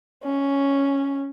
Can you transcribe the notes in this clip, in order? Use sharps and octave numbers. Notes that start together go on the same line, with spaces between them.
C#4